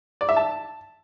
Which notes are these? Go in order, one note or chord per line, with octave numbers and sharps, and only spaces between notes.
D5
E5
A5